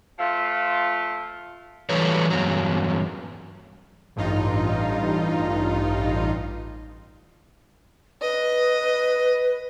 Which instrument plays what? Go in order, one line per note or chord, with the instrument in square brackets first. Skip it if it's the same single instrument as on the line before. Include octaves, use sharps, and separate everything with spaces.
[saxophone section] F3 A3 F4
[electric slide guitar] E3 F#3 G3 A3 B4 C#5
E2 G2 F#3
[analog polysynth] A1 G2 D#4 F4
[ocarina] B4 [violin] D#5